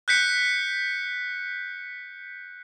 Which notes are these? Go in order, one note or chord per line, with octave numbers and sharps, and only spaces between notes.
F#6 G6 B6 C#7